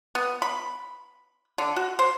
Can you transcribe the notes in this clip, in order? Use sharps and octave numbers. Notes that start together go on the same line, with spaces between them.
B3
B5
D3
F#4
C5